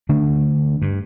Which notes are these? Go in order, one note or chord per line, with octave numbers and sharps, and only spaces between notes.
D3 A3 D4
G2